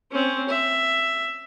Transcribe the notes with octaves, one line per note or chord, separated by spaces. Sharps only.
C4 C#4
E5